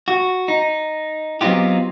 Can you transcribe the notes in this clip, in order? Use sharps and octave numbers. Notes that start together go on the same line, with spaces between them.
F#4
D#4
F#3 B3 C4 D#4 F4 G4